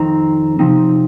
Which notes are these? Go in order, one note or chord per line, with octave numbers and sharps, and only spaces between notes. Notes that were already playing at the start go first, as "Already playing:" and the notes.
Already playing: F2 D#3 C4 D#4 A#5
C3 F3 C4 D#4